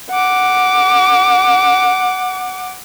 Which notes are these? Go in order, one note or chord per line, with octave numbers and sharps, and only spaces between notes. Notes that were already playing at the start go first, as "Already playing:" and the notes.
F#5 D6